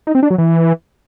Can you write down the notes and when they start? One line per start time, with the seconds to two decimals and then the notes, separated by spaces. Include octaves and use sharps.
0.07 D#4
0.15 C4
0.23 D4
0.30 F#3
0.38 E3